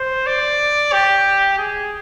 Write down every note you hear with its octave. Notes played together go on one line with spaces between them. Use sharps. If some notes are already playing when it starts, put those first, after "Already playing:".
Already playing: C5
D5
G4
G#4